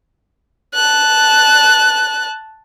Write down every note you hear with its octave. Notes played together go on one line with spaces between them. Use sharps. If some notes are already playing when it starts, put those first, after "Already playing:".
A5 F#6